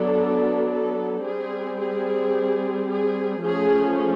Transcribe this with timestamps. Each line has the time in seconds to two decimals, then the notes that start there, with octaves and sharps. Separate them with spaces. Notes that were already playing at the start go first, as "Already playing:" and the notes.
Already playing: F#3 B3 D4 A4
0.69 A4
1.23 G3 C4 G#4
1.79 G#4
2.88 G#4
3.42 F3 A3 C#4 G#4